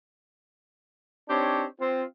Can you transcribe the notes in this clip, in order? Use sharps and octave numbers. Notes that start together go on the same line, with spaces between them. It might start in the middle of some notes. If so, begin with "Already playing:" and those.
C4 D4 D#4 G4 C#5
C4 F4